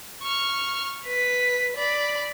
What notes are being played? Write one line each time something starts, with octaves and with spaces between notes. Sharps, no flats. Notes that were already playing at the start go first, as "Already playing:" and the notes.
C#6 F6
B4 B6
D5 B5